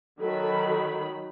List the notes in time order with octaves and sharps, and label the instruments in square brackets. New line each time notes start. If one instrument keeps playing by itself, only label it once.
[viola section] D#3 F#3 B5 [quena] A4